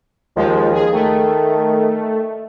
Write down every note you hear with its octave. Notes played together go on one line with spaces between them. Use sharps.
D#2 F3 G#3
G#4
D#3 A3